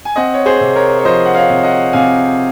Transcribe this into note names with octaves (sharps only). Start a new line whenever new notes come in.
G#5
C4 D#5 F#5
C#5
G#4 C5
C3
A#4 C#5
C#5
F3 C5 D#5
F#5
C#5 F5
C3
D#5 F#5
C3 F5 G#5